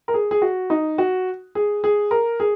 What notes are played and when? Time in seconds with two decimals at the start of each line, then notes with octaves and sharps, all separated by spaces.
0.08 A#4
0.14 G#4
0.31 G#4
0.42 F#4
0.70 D#4
0.98 F#4
1.55 G#4
1.84 G#4
2.11 A#4
2.40 G#4